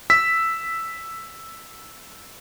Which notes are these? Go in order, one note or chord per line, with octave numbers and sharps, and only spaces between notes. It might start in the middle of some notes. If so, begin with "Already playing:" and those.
E6 B6